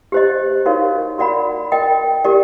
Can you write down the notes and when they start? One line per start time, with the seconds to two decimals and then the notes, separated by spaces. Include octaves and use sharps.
0.12 G4 C5 D#5
0.66 D#4 F#4 A#4 C#5 F5
1.18 F#4 A#4 D5 F#5 B5
1.72 A#4 D#5 G5
2.24 G4 A#4 D5